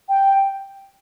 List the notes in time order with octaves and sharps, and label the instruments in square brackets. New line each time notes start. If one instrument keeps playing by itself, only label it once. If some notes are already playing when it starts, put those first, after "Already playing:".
[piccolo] G5